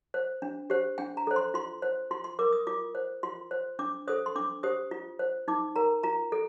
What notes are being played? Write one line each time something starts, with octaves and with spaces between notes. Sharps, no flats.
C5
D4
G4 C5
D4 G5
A#5
A4 C5
C6
F4 C6
C5
F4 C6
C6
A#4 D6
D#6
F4 D6
C5
F4 C6
C5
D4 D6
A4 C5 D#6
C6
D4 D6
G4 C5 D#6
F4
C5
D#4 D6
A#4 A#5
F4 A#5
A4